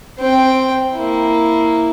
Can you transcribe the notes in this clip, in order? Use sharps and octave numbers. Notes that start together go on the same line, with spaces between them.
C4 G5
A#3 E4